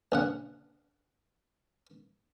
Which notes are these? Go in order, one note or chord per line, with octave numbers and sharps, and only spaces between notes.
A#1 C#3 F#5